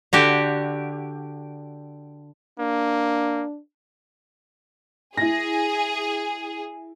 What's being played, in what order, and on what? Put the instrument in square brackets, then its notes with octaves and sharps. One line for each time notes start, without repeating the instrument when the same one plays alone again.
[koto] D3 F#4 G4
[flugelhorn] A#3 [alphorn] D4
[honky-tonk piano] E4 A#6 [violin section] G#4